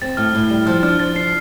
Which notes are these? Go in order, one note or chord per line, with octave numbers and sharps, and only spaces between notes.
C4 A6
A2 F6
A2
G3
F3 F6
D4 F6
F3 A6
D4 C7